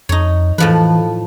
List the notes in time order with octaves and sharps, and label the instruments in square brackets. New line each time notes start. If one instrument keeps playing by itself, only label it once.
[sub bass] F2 [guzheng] D#4 C#5
[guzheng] A2 F3 B4 [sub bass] E3